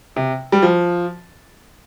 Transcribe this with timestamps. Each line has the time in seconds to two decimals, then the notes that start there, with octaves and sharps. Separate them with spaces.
0.16 C3
0.52 G3
0.62 F3